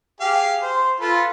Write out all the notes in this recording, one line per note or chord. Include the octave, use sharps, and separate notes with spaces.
G4 G#4 F5
C5
F4 A4 B4